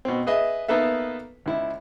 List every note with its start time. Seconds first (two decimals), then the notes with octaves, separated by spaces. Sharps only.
0.05 B2 C4
0.27 G#4 B4 D#5 E5
0.68 A#3 B3 D#4 A4 B4 E5
1.46 C#2 E4